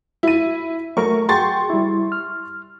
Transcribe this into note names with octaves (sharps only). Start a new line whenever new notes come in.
E4 D#7
F#3 A3 A#4 C#6
F#4 G#4 G5 C6 C#6 A6
G3 E4
F6